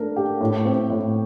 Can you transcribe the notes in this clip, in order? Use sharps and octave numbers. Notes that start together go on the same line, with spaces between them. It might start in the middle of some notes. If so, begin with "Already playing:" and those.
Already playing: A3 D4 A#4
G4
A2
C4
A2